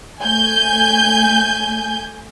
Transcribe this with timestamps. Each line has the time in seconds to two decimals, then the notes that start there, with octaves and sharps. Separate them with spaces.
0.22 A3 G#5 G6